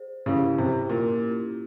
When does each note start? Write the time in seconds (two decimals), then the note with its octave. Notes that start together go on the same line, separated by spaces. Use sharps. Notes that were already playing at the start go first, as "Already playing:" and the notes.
Already playing: G#4 C5
0.26 C#3 C#4 E4 G4
0.58 C3
0.89 A#2